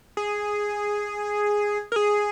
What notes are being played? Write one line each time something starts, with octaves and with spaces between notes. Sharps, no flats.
G#4
A#4
G#4